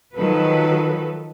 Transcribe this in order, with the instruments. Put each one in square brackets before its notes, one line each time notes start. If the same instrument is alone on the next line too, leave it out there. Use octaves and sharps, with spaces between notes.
[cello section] D#3 F3 F#3 F#4 A4 B4